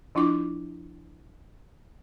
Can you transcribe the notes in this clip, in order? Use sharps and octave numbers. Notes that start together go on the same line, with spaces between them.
F3 D4 E4 F4 D6